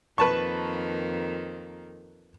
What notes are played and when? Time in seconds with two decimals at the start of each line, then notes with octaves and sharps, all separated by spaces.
0.18 F2 D#3 A#3 B4 A5 C#6